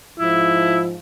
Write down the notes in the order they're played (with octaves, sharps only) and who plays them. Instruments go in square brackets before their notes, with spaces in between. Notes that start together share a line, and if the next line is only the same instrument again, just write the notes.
[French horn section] G#2 F3 [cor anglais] E4